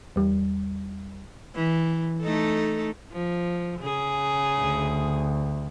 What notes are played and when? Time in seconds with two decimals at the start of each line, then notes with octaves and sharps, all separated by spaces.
0.16 E2 G3
1.55 E3
2.22 A3 D#4 A4
3.12 F3
3.80 C#3 G#4
4.60 D2